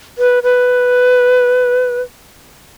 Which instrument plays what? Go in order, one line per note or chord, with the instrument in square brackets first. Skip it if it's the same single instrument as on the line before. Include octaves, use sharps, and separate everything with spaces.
[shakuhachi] B4
B4